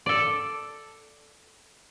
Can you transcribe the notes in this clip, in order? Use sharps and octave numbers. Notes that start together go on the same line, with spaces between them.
A4 D5